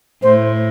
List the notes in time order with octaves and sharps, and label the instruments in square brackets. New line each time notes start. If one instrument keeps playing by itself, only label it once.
[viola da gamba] A2 [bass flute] C5